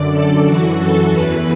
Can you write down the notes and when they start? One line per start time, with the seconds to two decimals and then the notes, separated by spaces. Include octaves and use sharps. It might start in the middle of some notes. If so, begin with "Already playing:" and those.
Already playing: F#2 D3 D5
0.11 A4
0.44 F#2 E3 F#4
0.78 A4
1.11 E2 E3 B4